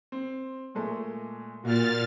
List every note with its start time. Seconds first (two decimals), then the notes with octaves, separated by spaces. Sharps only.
0.12 C4
0.75 A#2 G#3 A3
1.63 A#2 A#3 F#4 F6 A6